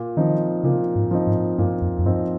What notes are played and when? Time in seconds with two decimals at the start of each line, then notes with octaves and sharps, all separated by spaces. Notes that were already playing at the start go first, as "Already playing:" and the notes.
Already playing: A#2
0.17 D#3 F3 C4 D#4
0.64 A#2 C#3
0.96 G#2
1.11 F3 C4 D#4
1.27 G#2
1.58 G2 A#2
1.82 F2
1.99 F2
2.05 G2 F3 C4 D#4